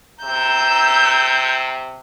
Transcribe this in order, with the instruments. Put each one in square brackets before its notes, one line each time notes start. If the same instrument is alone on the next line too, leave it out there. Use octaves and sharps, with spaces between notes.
[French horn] C3 [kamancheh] A#5 E6 [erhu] G6